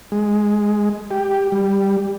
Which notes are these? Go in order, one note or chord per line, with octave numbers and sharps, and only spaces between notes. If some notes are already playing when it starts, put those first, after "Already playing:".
G#3
G4
G3